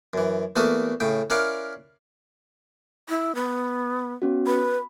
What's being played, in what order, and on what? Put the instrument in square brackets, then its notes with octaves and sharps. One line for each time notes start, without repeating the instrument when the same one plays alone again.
[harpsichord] F#2 E3
E2 A3 A#3 F#4 A5 D#6
A2 C#3 G5
C#4 E4 A#4 D5 F5 F#5
[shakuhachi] E4
B3
[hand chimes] B3 C#4 F#4
[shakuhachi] B4 [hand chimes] B5